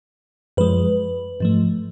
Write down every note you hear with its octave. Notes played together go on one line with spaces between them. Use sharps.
F#2 F3 G#3 B4
G#2 F3 A3